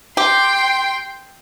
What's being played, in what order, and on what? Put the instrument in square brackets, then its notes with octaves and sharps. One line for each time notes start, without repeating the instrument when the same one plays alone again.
[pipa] G4 [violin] G5 C6